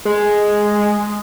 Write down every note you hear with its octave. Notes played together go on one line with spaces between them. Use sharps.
G#3